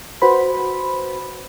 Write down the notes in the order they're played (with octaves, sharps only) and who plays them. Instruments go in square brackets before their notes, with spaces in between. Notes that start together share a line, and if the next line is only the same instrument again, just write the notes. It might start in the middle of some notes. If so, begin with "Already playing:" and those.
[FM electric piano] F#4 B4 C5 B5